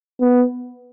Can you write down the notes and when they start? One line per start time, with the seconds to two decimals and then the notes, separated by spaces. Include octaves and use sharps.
0.21 B3